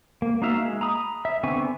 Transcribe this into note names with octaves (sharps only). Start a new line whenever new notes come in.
A#3
A#3 D#4 F#4 E5 F5
G#3
A#5 B5 D#6
E5
D3 B3 C4 G#5 C#6